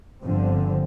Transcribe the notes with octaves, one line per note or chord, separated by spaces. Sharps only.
G1 D3 F3 C4